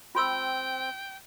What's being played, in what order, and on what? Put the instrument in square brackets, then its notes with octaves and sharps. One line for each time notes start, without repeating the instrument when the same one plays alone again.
[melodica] C4 [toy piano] F4 C6 E6 [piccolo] G5